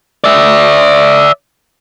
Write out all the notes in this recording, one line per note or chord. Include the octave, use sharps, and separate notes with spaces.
D5 E5